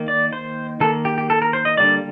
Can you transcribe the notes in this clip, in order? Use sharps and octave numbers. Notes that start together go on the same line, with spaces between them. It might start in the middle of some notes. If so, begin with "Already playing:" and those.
Already playing: D#3 A#3
D5
C5
D#3 A#3 A4
G4
G4
A4
A#4
C5
D#5
D3 G3 A#3 D5